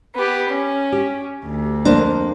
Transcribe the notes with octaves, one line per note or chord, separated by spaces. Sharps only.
B3 G4
C#4
G4
D2
F2 A#3 D4 C5